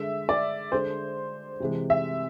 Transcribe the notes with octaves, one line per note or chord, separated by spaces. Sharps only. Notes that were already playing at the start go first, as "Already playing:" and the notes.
Already playing: D3 G#3 E5
D5
D3 G#3 C5
C3 E3 G#3
E5